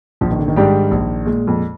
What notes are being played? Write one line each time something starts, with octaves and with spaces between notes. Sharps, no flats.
A#1 F3
D#3
D3
D#3
G#2 G3 D4 G4
A#1
A#2 G#3
F2